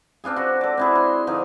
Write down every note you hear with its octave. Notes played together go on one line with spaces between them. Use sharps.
C4 D4 F4 G#4
F#4 C5
A4 D5
C4 E4 G#4
C6
D3 F3 D#4